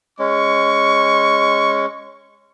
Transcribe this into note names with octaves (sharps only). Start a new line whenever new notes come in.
G#3 C#4 C#6